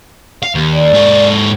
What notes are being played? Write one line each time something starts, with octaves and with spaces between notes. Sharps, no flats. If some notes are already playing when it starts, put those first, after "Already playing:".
F5
D#2
D5
G#2 A4